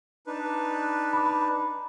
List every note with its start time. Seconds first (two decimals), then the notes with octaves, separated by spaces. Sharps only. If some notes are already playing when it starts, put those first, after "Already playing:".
0.27 D4 D#4 B4
1.13 B5 D6
1.26 A#5 B5